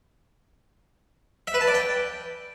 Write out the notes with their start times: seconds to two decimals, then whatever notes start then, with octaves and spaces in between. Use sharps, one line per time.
1.47 E5
1.54 B4
1.61 A5
1.68 D5
1.74 G5